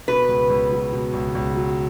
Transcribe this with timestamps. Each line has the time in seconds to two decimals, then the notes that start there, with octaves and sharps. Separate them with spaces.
0.08 B2 B4
0.29 C#2
0.50 C#2
0.72 F#3
0.93 B2
1.13 C#2
1.35 C#2
1.56 F#3